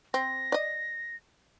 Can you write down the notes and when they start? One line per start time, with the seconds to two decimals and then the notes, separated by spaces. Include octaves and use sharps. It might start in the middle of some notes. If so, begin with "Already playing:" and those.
0.14 C4 A#6
0.52 D5 D#5